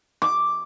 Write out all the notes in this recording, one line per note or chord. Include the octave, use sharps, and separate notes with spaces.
D6